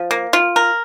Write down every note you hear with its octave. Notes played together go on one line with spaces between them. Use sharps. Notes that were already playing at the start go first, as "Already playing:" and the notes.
Already playing: F3
A#3
F4
A#4